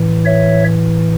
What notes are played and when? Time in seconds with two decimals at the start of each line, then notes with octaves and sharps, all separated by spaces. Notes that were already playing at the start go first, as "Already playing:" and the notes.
Already playing: A2 E3
0.25 C#5 E5